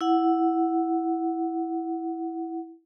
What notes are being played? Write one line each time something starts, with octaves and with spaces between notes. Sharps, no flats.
E4 F#5